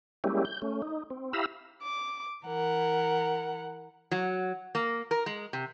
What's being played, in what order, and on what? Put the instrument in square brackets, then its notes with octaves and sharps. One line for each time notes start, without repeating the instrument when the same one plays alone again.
[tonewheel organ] G3 G#3 A#3 C#4 E4 G4
G6
A3 C#4
D#4
C4
E4 G4 F5 A#5 B5 E6
[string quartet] D6
E3 A#4 F#5
[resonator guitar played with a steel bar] F#3
A#3
A#4
G#3
C3